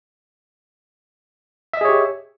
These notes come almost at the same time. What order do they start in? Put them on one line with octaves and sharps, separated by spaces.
E5 D#5 G#4 C#5 G4